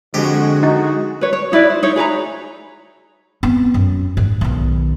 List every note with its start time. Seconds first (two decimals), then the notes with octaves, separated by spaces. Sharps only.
0.14 F2 D3 G#3 F#4 G4
0.63 D#4
1.21 B4 C#5
1.33 C#5
1.52 D#4 E4 B4 D5
1.70 C5
1.83 D#4 E4 C#5
1.96 G#4 B4 C#5 A#5
3.43 B3 C4
3.74 F#2
4.17 G#2
4.41 B1 D#3